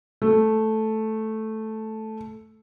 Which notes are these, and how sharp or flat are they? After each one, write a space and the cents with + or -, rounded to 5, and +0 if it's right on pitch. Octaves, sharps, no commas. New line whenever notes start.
A3 -5